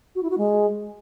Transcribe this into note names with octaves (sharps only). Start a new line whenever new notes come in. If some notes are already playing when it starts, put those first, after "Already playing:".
F#4
E4
F#4
G#3